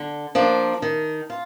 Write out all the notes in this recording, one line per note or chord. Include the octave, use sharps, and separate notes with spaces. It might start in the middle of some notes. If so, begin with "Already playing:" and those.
Already playing: D3
F3 A#3 D4
D#3
F4